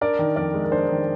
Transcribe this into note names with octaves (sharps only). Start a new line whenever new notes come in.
D4 A#4 D5
D#3
F2 A#4 D5
G#3
A#4
D4 C5
D#3